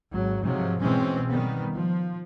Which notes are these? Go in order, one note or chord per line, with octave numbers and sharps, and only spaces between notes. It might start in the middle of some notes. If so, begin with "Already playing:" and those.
G#1 F#3
G#2 C3 F3 F#3
B2 E3 G#3 C4 C#4
D#3 G3 B3
F3